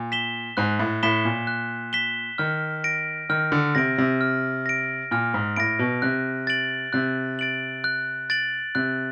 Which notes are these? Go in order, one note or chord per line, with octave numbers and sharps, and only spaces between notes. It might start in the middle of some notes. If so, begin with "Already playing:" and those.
Already playing: A#2
B6 E7 G7
G#2 F#6
A2
A2 B6 E7 G7
A#2
F#6
B6 E7 G7
D#3 F6
A#6 D7
D#3 F6
D3
C3 A#6 D7
C3
F6
A#6 D7
A#2 F6
G#2
A2 A#6 D7
B2
C3 F#6
A6 D7 F#7
C3 F#6
A6 D7 F#7
F#6
A6 D7 F#7
C3 F#6